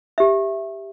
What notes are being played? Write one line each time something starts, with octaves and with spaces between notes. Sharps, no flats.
G4 E5